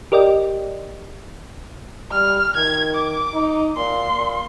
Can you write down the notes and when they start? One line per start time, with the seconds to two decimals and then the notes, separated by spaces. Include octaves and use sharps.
0.12 G4 A#4 D5 D#5 G5
2.12 G3 F6
2.56 D#3 G#6
2.95 D6
3.34 D#4
3.77 A#2 C6
4.17 A#2